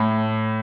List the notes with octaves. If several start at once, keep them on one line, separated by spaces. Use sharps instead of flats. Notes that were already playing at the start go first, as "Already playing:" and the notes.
Already playing: A2